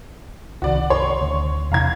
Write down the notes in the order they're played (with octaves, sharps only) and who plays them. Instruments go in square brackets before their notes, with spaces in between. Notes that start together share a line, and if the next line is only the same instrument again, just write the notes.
[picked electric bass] C2 C3 D#3 [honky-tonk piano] F#4 D5
[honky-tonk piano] C#5 C6
[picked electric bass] D2
[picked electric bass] E2 C3 [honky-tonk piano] F5 A#5 G#6